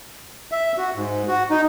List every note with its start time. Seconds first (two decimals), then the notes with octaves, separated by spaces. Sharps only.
0.52 E5
0.78 F#4
0.95 G#2
1.28 F#4
1.50 D#4